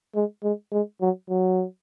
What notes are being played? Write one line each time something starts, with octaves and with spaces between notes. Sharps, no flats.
G#3
G#3
G#3
F#3
F#3